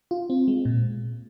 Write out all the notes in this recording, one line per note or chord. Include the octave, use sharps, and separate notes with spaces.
F4
C4
G#3
A#2